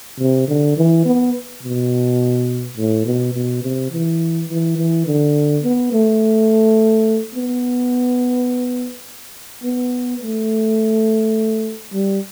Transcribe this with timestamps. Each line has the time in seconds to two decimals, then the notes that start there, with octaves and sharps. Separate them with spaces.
0.19 C3
0.48 D3
0.77 E3
1.05 B3
1.63 B2
2.77 A2
3.05 B2
3.34 B2
3.63 C3
3.91 E3
4.49 E3
4.77 E3
5.06 D3
5.63 B3
5.92 A3
7.35 B3
9.64 B3
10.22 A3
11.93 G3